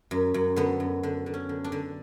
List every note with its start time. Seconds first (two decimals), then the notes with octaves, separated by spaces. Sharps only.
0.11 F#2
0.34 F#2
0.56 D3 B3
0.80 F#2
1.03 D3
1.26 D3
1.34 C#4
1.49 D3
1.64 D4
1.72 D3